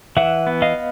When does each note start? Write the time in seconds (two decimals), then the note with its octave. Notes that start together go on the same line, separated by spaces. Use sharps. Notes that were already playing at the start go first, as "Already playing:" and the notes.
0.17 E3 E5 F#5
0.47 B3
0.62 D#5 F5